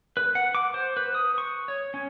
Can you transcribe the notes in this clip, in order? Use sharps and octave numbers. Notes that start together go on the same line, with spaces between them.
B4
F#5
D6
C5
B4
D#6
C#6
C#5
C#4